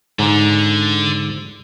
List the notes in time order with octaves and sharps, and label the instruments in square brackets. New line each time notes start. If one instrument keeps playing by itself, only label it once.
[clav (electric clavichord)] G#2 [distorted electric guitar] D3